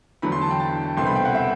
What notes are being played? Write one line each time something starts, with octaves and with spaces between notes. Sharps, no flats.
E2 D3 F#3 B5
C6
A5
G5
A5
C2 B2 A3 C4 C6
B5
G5
F#5
E5